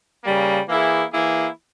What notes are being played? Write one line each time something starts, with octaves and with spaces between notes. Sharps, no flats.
C#3 G3 A#3
E3 A#3 E4 G#4
E3 A#3 E4 G#4